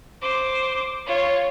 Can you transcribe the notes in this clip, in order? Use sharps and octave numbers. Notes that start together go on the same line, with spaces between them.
C5 D6
F4 C#5